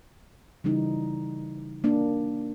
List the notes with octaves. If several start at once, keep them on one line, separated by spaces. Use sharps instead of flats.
C#3 E3 G3 D#4
A#3 D4